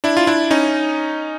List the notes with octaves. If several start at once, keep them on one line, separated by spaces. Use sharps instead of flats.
D4 E4
F4
D4 E4
C#4 D#4